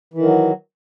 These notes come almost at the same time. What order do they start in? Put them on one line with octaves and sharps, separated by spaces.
E3 D#3 F#3